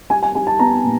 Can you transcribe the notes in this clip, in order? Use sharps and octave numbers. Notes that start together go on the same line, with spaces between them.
G3 G#5
G#5
G3 G#5
A5
B3 A#5
A#2